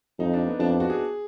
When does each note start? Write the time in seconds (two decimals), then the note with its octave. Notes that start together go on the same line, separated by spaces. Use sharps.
0.19 F2 D#4
0.33 D4
0.46 B3
0.59 F2 D4
0.70 D4
0.80 F#4
0.90 G#4